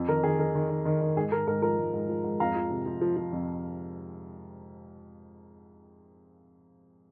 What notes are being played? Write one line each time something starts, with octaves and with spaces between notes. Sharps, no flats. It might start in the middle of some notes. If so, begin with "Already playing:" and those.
Already playing: F2
D#3 A#4
D#3 G#4
D#3 A#4
D#3
D#3
D#3
D#3
G#2 G#4
G#2 A#4
G#2 A#4
F3 A#4
G#2
G#2
F3
G#2
F2 F5 A#5
F3
C3
F3
F3
F3
F2